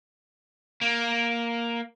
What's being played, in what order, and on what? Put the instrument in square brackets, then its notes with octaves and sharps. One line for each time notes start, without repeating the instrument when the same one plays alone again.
[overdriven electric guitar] A#3